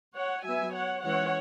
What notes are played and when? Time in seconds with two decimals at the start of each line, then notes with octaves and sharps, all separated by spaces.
0.15 C#5 F#5
0.44 F#3 B3 E5 G#5
0.74 C#5 F#5
1.04 E3 G#3 C#4 C#5 F#5